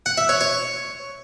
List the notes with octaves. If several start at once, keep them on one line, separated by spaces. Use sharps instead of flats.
F#5
E5
C#5
C#5